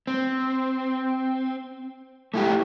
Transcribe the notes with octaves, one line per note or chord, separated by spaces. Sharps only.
C4
A3 E4 G4